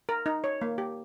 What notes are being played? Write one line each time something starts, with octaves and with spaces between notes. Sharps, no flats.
A#4
D#4
C#5
A#3
G4